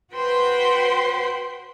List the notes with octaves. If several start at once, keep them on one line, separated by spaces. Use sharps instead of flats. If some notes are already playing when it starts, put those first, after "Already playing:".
F#4 B4 C5 G5 C6